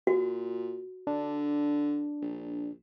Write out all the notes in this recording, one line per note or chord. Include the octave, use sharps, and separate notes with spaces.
A#2 F#4
D3 D4
A#1